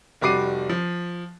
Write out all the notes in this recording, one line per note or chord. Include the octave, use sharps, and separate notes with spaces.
F1 G3 F#4 D6 C7 D#7
F3